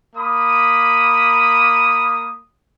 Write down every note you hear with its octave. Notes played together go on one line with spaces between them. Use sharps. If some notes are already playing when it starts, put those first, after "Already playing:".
A#3 B5 D#6